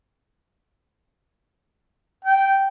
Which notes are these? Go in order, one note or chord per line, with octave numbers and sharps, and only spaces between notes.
G5